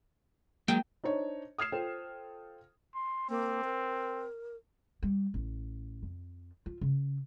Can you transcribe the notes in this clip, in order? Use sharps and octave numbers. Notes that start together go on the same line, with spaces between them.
F#3 G#3 A#3 G5
D4 D#4 C5 C#5
D#6 F6 G#6 C7 E7
F4 A4 C5 G5
C6
A#3 C4
A#4
G3
A1
F2
F4
C#3